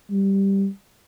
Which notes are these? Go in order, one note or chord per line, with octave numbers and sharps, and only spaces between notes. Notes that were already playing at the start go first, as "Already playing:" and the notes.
G3